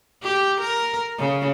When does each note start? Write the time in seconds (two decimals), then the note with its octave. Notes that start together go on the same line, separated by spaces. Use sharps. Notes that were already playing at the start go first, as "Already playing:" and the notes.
0.23 G4
0.61 A#4
1.18 C#3